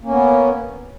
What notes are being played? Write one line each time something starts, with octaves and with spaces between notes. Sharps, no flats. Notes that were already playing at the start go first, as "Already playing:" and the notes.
A#3 B3 C#4